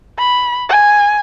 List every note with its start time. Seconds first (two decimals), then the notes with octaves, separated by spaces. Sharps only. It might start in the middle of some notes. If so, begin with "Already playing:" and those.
0.18 B5
0.69 G#5